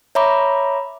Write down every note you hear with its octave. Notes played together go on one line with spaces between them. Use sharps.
C#5 E5 A#5 B5 D6